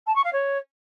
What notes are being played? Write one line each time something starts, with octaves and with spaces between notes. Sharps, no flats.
A5
C#6
F5
C#5